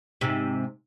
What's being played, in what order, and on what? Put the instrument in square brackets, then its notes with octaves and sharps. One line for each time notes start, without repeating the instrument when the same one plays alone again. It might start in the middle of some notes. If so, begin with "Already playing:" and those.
[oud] G#2 C3